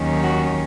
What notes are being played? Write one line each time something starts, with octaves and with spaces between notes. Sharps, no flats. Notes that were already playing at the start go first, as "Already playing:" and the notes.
Already playing: D#2 D#3 F#3 C#4
F#4